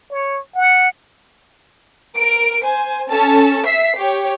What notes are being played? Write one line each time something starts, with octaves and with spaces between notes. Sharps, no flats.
C#5
F#5
A#4 D7
C5 G#5
C#4 A4 A5
E5 B6 C7
G4 C#5